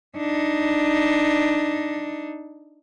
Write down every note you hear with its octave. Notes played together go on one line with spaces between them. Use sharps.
D4 D#4